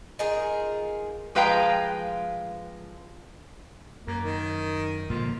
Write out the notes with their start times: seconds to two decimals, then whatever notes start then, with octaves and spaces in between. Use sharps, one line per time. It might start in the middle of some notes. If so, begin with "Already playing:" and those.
0.19 D#4 F4 G#4 A#4
1.35 F3 G#3 B4 F5 G5 A#5
4.07 F#2 A#3
4.25 D#3
5.10 A#2 D3 F3 F4